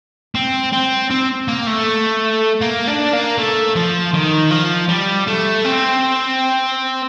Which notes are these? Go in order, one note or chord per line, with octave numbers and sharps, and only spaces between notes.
C4
C4
C4
A#3
A3
A#3
D4
A#3
A3
F3
D#3
F3
G3
A3
C4